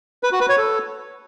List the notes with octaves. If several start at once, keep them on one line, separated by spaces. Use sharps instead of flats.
B4
F#4
B4
C#5
A4